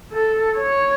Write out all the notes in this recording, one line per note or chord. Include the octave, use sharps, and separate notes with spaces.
A4
C#5